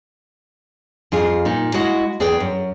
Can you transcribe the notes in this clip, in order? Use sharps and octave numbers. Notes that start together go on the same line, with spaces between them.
F2 F4 G#4
A#2 D#4
G#3 E4 F#4 D#5 F5 F#5
E2 G#4 B4 D5 G5
F#2